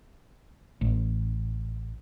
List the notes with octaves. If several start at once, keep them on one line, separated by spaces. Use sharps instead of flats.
A1